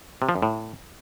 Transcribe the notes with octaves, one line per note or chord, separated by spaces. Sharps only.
C3
F3
F#2
A2